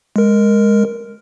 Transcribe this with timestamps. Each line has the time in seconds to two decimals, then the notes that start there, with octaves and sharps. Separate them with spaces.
0.16 G#3 A#4